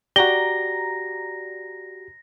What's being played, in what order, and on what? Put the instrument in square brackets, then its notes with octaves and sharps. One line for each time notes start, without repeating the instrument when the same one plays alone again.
[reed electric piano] F#4 G4 [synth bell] D5 A#5 [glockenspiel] A#6 [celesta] G7